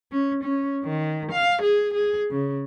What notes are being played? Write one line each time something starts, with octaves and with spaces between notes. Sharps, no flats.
C#4
C#4
D#3
F5
G#4
G#4
C#3